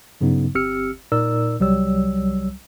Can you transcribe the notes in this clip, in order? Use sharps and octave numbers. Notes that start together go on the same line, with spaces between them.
G2 C#3 F#3 B3 D#4
G1 C4 G4 E6 F6 C#7
A#2 D#4 A#4 D5 E6
C2 F#3 G3 C#5 E6